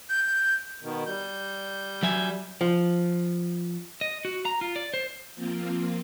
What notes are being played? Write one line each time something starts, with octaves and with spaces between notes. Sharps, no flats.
G6
B2 D#3
G3 G6
F#3 E5 G#5
F3
D#5
F#4
A#5
F4
D5
C5
F3 A#3 C4 F4